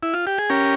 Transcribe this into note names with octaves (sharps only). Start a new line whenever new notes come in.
E4
F4
G4
G#4
C#4 G4 A#4